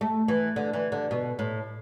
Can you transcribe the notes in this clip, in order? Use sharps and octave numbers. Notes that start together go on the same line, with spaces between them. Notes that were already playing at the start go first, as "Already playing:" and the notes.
A3
E3
D3
E3
D3
B2
A2